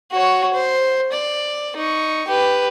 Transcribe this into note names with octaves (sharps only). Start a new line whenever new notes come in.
F#4 C#5
C5
D5
D#4 C#6
G4 B4